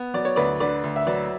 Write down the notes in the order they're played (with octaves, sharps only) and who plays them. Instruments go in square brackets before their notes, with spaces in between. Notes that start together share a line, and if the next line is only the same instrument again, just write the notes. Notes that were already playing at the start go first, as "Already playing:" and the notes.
Already playing: [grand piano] B3
[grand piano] F#3 [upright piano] D5
[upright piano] C#5
[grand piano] D2 [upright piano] B4 D5
[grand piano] D3 [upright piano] B4 D5
[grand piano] D2
[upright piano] E5
[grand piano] F#3 [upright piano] B4 D5